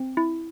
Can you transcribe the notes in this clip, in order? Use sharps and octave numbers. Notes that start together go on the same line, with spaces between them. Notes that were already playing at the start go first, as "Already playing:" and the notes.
Already playing: C4
E4